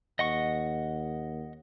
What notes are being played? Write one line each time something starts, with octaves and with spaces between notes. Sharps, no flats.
D#2 D#5 F#5 C#6